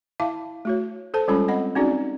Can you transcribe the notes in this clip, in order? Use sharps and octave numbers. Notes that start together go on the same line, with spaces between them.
E4 E5 F5 A5 D6
A3 F#4 C#5
A4 C5 A5
G3 G#3 C#4 F4 A4 B5
C4 D#5 F#5 B5
C4 C#4 D#4 F#4 G#4 D5